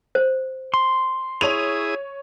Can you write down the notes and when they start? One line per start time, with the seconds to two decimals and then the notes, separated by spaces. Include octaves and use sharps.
0.15 C5
0.74 C6
1.41 E4 G#4 C#5 D#6 D#7 F7